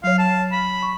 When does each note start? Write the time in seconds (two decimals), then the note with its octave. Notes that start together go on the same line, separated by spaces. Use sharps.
0.04 F#3 C#5 F5
0.19 A5
0.52 B5
0.83 C#6